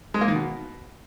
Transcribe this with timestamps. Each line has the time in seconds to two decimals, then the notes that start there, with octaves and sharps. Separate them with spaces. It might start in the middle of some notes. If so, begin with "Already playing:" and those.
0.14 G#3
0.21 A#3
0.28 D#3
0.35 B2